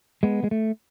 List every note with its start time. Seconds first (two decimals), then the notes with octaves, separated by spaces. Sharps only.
0.23 G#3 B3
0.44 G#3
0.51 A3